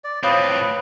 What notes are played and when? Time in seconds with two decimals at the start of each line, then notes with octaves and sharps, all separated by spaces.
0.04 D5
0.23 A2 C4 F4 B4 C#5 D#6